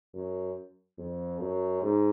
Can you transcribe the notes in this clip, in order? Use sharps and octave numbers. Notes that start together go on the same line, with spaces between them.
F#2
F2
F#2
G#2